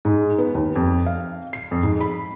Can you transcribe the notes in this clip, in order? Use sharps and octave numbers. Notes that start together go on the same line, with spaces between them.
G#2
B3
D#2
F2
F5
C7
F2
G#2
B5